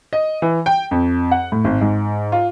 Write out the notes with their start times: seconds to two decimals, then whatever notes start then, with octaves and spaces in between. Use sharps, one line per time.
0.13 D#5
0.42 E3
0.66 G5
0.91 F2
1.31 F#5
1.52 A2
1.64 G#1
1.81 G#2
2.32 F4